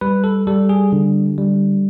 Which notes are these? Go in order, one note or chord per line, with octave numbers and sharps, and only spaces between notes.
G3 B4
A4
G3 A4
G#4
D3
G3